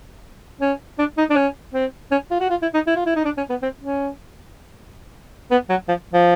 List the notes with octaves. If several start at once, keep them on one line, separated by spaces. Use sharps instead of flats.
C#4
D4
D#4
D4
C#4
C4
C#4
F4
F#4
F4
E4
D#4
E4
F4
E4
D#4
D4
C#4
B3
C4
C#4
B3
F#3
F3
F3